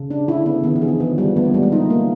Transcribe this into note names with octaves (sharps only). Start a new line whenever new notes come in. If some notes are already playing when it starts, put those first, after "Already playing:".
Already playing: C#3
D4
D3 E4
D3 B3
D#3 B3
E3
G#4
F3
F3 B3
G3
A3 B3
A#3
G3 G#3
A3
D#4
A#3